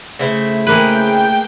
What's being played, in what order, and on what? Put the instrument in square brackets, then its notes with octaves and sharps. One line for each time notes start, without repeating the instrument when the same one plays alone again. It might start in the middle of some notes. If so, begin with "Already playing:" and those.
[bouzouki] C#3 E4 C5 [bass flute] A3
[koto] G#3 A#3 B4 [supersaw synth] G5